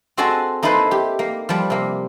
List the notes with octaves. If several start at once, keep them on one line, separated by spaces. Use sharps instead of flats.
C4 F#4 G#4 A4 D#5 A5
A#3 D#4 E4 A4 B4 C5
G4
A#3
F3 G3
C3 A#3